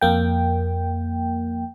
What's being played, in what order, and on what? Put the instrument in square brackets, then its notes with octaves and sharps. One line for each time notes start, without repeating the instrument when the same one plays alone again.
[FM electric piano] F2 A#3 G5